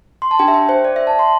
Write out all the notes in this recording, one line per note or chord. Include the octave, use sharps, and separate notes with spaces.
C6
A5
D4 G4 G5
E5
G5
C5
D5
E5
A5
C6